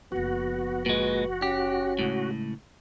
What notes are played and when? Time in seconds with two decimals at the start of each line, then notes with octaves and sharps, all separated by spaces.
0.12 F#1 F3 B3 F#4
0.86 A#2 G#3 B4
1.42 C#4 G4
1.99 C#2 A2